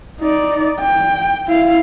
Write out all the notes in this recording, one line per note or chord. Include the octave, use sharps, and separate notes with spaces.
D#4 D5
G5
E4 F5